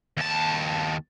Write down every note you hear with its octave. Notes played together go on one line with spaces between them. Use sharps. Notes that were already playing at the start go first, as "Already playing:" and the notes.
D#2 A5